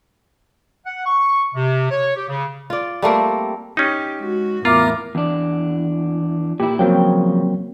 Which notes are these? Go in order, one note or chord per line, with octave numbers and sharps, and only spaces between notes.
F#5
C#6
C3
C#5
G4
C#3
F4 D5
G3 A3 A#3 C4
C#4 D#4 G4
G#3 F#4
E2 A2 B3 E4 F4 A#4 A#5 D6
E2 D4
A#2 E4 G4
C#3 F3 F#3 A#3 C4 G5